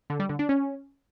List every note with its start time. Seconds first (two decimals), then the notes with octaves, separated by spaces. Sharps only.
0.10 D3
0.20 G3
0.29 D3
0.39 D4
0.49 C#4